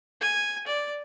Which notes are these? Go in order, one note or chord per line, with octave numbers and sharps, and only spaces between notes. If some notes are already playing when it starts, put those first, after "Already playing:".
G#5
D5